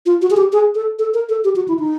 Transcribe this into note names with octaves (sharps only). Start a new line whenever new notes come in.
F4
F#4
G#4
G4
G#4
A4
A4
A#4
A4
G4
F#4
E4
D#4